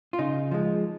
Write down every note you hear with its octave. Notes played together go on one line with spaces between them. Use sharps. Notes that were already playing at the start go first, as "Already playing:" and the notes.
F4
C#3 D#4
F3 G#3